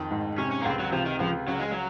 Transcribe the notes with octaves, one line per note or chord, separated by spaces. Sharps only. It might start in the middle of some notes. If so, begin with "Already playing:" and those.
Already playing: F2 D#3
G#2
C3 C#4
C#4
A#3
C#2 C4
F#3
C3 F3
D#3
C#2 F3
C#3 F#3
G#3
F#3